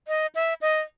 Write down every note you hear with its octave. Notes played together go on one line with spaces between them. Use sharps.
D#5
E5
D#5